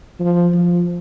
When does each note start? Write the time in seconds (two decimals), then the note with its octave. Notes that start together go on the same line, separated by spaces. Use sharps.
0.19 F3
0.53 F3